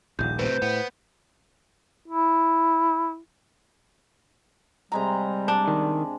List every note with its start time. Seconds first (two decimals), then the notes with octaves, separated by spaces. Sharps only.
0.19 D#1 A#1 G6
0.39 A2 C3 B4 C5
0.62 A2 B3
2.08 E4
4.92 C3 G3 G#3 A#5
5.48 D4
5.68 D#3